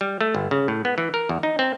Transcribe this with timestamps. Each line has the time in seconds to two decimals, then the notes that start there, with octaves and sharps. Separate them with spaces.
0.01 G3
0.21 A3
0.35 G1
0.51 C#3
0.68 A2
0.85 B3
0.98 E3
1.14 A#4
1.29 E2
1.43 D#4
1.59 C4